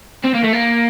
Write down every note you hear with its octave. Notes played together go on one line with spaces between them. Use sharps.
C4
A#3
A3
A#3